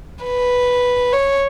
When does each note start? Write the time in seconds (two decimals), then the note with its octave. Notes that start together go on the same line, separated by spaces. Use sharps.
0.24 B4
1.13 C#5